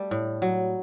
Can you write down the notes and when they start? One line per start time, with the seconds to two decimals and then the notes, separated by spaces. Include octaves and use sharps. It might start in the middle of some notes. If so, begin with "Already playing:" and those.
Already playing: G3 A3
0.11 A2
0.42 F#3